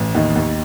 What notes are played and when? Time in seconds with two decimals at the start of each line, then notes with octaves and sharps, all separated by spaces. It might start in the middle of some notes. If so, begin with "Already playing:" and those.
Already playing: A1
0.14 D#2 D#4
0.35 D#2